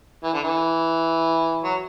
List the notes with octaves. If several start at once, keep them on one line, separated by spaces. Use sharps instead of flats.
E3
D3
E3
F#3